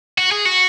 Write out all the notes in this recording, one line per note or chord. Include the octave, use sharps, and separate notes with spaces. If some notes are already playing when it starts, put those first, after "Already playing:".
F#4
G#4
F#4